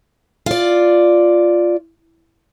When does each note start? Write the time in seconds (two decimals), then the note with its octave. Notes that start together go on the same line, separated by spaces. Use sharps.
0.46 F4 D5